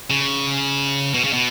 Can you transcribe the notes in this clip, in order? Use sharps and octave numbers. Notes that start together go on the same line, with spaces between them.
C#3
B2
C#3
B2